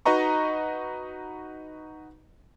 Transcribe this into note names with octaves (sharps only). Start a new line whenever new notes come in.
D#4 F#4 B4 D#5 A#5 C#6